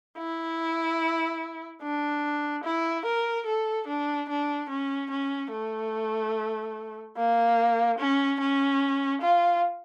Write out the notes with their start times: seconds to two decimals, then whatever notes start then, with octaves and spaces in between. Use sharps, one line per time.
0.18 E4
1.82 D4
2.64 E4
3.05 A#4
3.46 A4
3.87 D4
4.29 D4
4.69 C#4
5.11 C#4
5.52 A3
7.17 A#3
7.99 C#4
8.40 C#4
9.22 F4